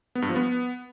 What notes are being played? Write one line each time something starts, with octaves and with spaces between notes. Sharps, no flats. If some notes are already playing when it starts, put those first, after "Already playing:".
B3
G2
F3
B3